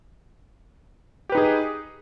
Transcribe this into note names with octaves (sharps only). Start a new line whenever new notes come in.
D#4 G4 G#4 B4